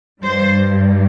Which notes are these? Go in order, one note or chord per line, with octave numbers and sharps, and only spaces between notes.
G2 G3 C5